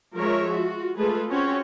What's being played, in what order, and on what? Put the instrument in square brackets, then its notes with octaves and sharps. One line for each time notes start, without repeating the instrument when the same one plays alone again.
[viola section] F3 G#3 A#4 C#5 E5
F4 F#4
G#3 A3 F4 G#4 A4 B4
C4 C#4 F#4 C#5